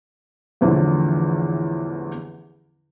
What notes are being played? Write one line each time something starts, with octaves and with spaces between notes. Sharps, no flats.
A1 E2 D3 E3 F3